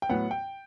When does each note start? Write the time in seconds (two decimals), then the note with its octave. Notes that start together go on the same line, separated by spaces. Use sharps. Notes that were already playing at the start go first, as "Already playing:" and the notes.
0.02 G5
0.09 A2 F#3 B3 F#5
0.31 G5